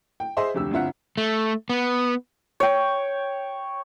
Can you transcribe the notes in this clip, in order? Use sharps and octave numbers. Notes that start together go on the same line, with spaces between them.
G5
G#4 C5 D#5 E5 C6
F1 D2 G4 E6
G1 G2 C4 F4 E5 F#5
A3
B3
C#5 G5